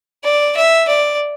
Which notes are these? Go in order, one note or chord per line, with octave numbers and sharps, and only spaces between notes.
D5
E5
D5